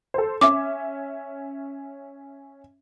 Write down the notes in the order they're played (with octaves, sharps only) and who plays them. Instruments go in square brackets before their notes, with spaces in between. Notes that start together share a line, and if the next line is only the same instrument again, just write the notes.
[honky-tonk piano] A4 C5
[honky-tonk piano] C#4 E5 [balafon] D6